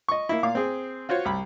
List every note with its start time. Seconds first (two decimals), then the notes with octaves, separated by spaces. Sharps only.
0.09 D#5 C#6
0.29 A#3 E4
0.43 A#2 F5 D6
0.55 C4 G#4
1.09 F4 F#4 C5 C#5
1.25 C2 B5